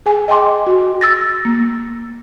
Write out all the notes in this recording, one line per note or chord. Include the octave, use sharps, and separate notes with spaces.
G#4 G#5
D#5 G5 G#5 C6 D6
F#4
E6 A6 A#6
A#3